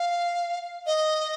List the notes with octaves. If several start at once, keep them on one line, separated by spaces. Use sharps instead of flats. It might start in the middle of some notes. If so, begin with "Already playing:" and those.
Already playing: F5
D#5